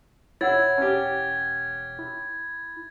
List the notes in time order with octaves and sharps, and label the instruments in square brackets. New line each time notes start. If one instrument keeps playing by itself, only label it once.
[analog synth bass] E1 [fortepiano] E4 [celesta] C#5 F#5 E6 [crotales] G#6 A6
[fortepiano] C#4 G4
[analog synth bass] E4